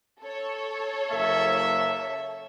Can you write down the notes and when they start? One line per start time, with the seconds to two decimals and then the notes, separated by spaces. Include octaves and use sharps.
0.22 A4 C#5
1.11 F#1 A#3 E5